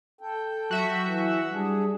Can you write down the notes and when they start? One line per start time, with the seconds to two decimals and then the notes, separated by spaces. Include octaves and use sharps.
0.21 A4 G5
0.71 F#3 F#4 E5
1.04 E3
1.52 G3 D4 G#4